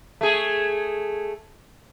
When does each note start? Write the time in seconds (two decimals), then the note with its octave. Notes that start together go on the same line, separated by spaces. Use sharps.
0.21 A3 G#4